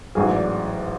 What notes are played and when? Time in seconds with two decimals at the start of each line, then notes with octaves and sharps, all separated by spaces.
0.15 A1 G#2 F#3 G#4
0.31 D5